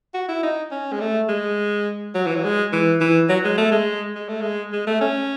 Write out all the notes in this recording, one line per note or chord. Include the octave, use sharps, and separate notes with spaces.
F#4
E4
D#4
C#4
G#3
A3
G#3
F#3
E3
F#3
G#3
E3
E3
F#3
G#3
A3
G#3
G#3
A3
G#3
G#3
A3
C#4